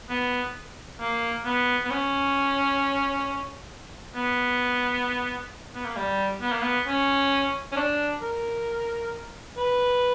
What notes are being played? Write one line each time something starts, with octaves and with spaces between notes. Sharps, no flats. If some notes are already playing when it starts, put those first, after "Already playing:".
B3
A#3
B3
B3
C#4
B3
B3
A#3
G3
B3
A#3
B3
C#4
C#4
D4
A#4
B4